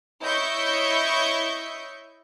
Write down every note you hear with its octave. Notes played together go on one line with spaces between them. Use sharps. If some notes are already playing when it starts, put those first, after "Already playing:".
E4 C#5 D#5 E5 C#6 G6